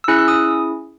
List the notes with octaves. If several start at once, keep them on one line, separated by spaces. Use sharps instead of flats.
E6
C#4 E4 G#4 F#6
E6
D#6